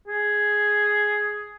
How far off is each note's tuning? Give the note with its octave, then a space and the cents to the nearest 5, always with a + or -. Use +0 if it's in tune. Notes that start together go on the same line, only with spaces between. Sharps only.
G#4 +5